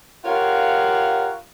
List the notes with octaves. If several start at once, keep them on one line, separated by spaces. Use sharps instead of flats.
F4 G4 A#4 C#5 F5 F#5